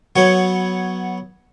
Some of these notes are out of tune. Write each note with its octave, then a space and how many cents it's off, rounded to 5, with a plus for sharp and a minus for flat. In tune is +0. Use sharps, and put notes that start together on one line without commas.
F#3 +0 B3 -10 C#5 +0